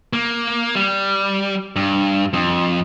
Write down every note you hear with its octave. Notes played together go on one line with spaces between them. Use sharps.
A#3
G3
G2
F2